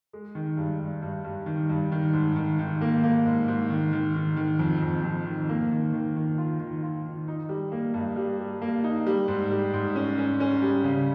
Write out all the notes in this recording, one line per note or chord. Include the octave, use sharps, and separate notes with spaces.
G#3
D#3
G2
G2
G2
G2
D#3
G2
D#3
G#2
D#3
D#3
A#3
A#3
G#2
G#2
D#3
D#3
D#3
D#3
F2
F2
F2
D#3
A#3
D#3
D#3
D#3
F4
D#3
F4
D#3
D#4
G3
A#3
G2
G3
G3
A#3
D#4
G3
G#2
G3
G#2
C#4
C#4
C#4
G3
C#3